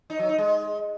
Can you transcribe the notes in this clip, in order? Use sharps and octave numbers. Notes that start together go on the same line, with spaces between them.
D#4
F#3
D#4
G#3